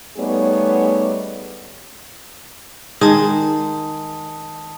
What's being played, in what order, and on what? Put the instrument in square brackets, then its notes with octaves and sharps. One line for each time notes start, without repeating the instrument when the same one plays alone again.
[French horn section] G3 A3 B3 D#4 G#4 C#5
[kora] D#3 G#3 [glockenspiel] A5 D#6